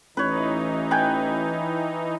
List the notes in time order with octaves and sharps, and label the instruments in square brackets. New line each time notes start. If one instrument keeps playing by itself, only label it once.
[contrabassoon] A1 [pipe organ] E3 D#4 [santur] B4 C#5
[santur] B4 G5 G#5